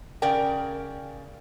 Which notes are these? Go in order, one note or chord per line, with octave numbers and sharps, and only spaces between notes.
C#3 A#4 D5 G5